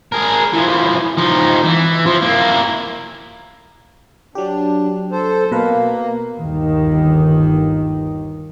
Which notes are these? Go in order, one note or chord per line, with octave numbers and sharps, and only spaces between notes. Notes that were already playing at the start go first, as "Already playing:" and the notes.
G#4 A#4
E3 F3
F3 D#4
E3
F3
A#3 E4
F#3 D4 G4
A4 C5
B2 A#3 B4 F5
G1 D#2 D#3